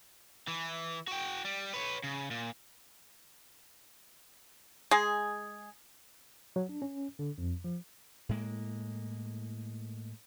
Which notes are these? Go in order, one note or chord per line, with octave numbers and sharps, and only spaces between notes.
E3
F#4 G5
G3
B4 C#5
C#3
A#2
G#3 G#4
F#3
D4
C#4
D3
F2
F3
A2 G#3 A#3